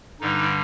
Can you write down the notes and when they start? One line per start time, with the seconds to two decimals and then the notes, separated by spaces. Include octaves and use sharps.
0.20 G2 D3 G3 D#4